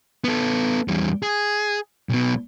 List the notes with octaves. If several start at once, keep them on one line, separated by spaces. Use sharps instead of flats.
B3 A4
E2 G3
G#4
B1 B2